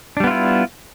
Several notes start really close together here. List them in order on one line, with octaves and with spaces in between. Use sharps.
D4 G3 B3 F4 E4